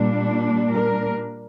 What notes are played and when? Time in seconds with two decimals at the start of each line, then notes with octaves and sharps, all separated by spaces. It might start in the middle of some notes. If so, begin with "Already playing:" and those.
Already playing: A#2 G3 D4
0.73 A#4